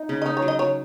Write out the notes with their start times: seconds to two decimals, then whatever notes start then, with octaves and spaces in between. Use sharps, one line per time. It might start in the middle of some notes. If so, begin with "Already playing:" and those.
Already playing: D#4
0.09 C#3
0.22 D#5
0.26 D#4 C#5
0.37 C#5
0.42 F#3
0.48 D#5
0.59 F#3 C#5